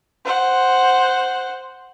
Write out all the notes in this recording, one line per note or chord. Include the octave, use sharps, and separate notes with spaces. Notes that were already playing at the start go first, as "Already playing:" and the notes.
C5 F#5